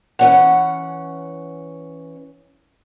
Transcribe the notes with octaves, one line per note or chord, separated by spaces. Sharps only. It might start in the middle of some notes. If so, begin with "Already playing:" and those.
E3 C#4 F#5